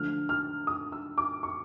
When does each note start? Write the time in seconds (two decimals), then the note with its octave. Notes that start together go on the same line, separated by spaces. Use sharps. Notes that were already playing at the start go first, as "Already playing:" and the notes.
Already playing: D3 F3 A3 F6
0.29 F6
0.67 D#6
0.92 E6
1.18 D6
1.43 C#6